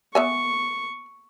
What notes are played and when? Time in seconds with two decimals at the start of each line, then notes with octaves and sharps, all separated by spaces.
0.15 B3 E5 G#5 C#6